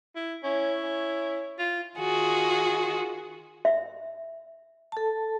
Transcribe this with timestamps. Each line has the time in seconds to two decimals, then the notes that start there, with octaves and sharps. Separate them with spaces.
0.15 E4
0.44 C#4 E4
0.83 C#4
1.58 F4
1.97 D#3 F4 F#4 G#4
3.65 E5
4.92 A4 A5